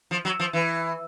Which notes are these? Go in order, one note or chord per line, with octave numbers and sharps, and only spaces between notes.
F3
F#3
F3
E3